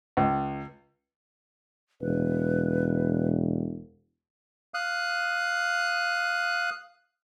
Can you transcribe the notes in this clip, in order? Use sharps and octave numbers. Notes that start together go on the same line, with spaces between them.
C#2
E1 B4
F5 D#6 F#6